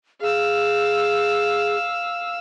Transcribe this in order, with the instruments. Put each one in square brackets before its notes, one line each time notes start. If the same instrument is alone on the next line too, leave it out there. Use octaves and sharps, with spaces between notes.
[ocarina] G#4 [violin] F5 E6